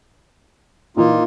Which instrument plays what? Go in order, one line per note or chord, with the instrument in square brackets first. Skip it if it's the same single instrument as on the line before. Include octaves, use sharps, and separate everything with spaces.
[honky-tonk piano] A#2 E3 [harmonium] A#3 D#4 F4